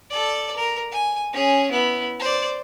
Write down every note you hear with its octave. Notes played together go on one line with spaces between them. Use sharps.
A4 D5
A#4
G#5
C#4 G#4
B3 E4
C5 D5